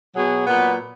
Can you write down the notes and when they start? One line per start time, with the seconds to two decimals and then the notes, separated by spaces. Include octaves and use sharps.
0.15 B2 F#3 G#4
0.46 A#2 F#3 B3